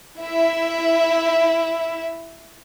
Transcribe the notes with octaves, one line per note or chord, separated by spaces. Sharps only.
E4 E5